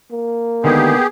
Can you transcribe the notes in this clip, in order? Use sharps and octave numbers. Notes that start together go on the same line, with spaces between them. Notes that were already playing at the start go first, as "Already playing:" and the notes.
A#3
D3 D#3 G#3 B3 G4 G#4